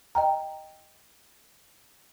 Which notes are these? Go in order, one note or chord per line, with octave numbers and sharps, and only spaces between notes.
D#5 G5 A#5